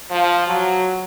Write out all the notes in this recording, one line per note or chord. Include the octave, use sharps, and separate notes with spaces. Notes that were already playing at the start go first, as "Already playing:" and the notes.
F3
F#3